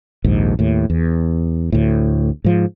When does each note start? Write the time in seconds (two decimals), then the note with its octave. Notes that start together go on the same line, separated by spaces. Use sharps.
0.24 A#1 D#2 G#2
0.59 D#2 A2
0.90 E2
1.72 D2 A2
2.44 G#2 F3